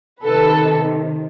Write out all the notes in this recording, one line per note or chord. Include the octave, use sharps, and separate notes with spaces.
C3 D#3 A4 B4